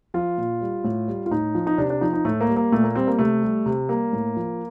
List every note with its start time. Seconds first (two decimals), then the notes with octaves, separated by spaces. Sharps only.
0.14 F3 F4
0.38 A#2
0.61 G3
0.84 A2
1.08 G3
1.26 F4
1.31 A2 D#4
1.55 F3
1.67 D#4
1.78 C3 D4
1.90 D4
2.01 F3 D#4
2.14 D#4
2.25 A2 A3
2.41 A#3
2.49 G3
2.56 A#3
2.72 A#2 A3
2.83 A#3
2.95 G3 C4
3.07 A#3
3.19 C3 A3
3.42 G3
3.66 C3
3.89 G3 A#3
4.13 A2
4.36 F3